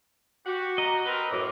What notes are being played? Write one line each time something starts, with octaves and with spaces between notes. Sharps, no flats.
F#4 G4
D#5 A#5
C4 A#4 B4
F#2 A2 D6